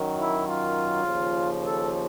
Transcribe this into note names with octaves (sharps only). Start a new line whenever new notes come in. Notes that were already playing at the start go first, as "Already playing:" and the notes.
Already playing: F#2 D#3 F#3
E4
F4
D#2 C#3 F3
A4